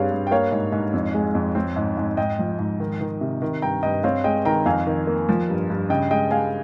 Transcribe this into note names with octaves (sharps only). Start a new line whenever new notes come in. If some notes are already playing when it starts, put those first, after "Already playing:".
Already playing: G2 G3 C4 G#4 C#5 F5
G2
G5
A#3 C#5 F5
G#2
G#2
F2
G#3
F2
C4
G#2
G#2
G#2 D#5 G5
F3
G#2
D#3
D#3
C3
D#3
G2 G5 A#5
G2 D#5 G5
C4 C#5 F5
G#3 D#5 G5
D#3 G5 A#5
F2 F5 G#5
D#3
A#3
F3
G2
G2
C#3 D#5 G5
G#3 D#5 G5
G#3 F5 G#5